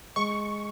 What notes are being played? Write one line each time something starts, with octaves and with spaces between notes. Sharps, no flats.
G#3 C#6